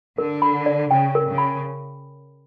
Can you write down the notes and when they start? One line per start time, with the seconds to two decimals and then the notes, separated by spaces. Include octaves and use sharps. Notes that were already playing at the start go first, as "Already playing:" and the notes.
0.18 D3 A#4
0.42 B5
0.66 D5
0.90 C#3 G5
1.15 A#4
1.26 C#3
1.38 B5